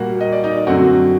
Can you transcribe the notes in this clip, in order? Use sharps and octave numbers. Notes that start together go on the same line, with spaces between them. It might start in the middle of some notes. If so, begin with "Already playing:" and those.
Already playing: A#2 G3 A#3 F#4 F#5
D#5
D5
D#4 D#5
F#2 D3 F#3 A3 C4 F#4 F#5